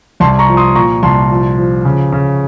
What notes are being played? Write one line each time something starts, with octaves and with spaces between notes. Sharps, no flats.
C2 A5 C6
A#5 C#6
F3
C6 D#6
A#2 A#5 C#6
C2 A5 C6
F3
F3
C#3
C#3